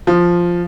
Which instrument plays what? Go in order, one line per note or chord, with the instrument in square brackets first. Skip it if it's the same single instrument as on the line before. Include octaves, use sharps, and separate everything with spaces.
[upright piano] F3